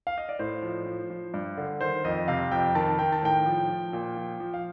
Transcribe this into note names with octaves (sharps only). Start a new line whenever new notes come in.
F5
D#5
D5
A2 C5
F3
F3
F3
G2
D3
D#3 C5
F2 D#5
C3 F5
F2 G5
D#3 A5
D#3 G5
A5
A2 G5
F3
F3
A#2
F3
F3
F5